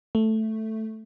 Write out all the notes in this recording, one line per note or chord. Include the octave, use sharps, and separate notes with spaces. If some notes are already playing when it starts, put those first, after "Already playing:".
A3